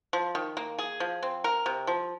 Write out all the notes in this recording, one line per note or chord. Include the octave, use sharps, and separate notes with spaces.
F3
D#3
A#3
G#4
F3
C4
A#4
C3
F3